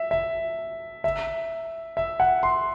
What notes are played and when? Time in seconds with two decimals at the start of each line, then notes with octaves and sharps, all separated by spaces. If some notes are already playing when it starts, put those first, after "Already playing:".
Already playing: E5
0.11 E5
1.04 E5
1.97 E5
2.20 F#5
2.43 C6